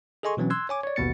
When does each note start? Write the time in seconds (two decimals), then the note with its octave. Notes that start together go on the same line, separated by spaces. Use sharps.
0.23 G#4 A4 D#5 G#5 C6 C#6
0.37 B2 E3 F#3 C4 C#4
0.50 C6 E6 F#6 G#6
0.69 C#5 G#5 D6
0.84 C#5 D5
0.96 A1 D#2 B2 B3 A6 C#7